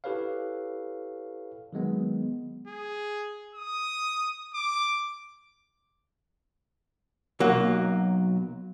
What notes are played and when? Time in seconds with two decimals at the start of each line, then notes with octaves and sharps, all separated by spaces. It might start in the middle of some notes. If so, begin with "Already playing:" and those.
0.04 E4 G4 A4 B4 C#5 F5
1.73 D#3 F#3 G#3 B3
2.67 G#4
3.55 D#6
4.54 D6
7.40 B1 F#3 A#3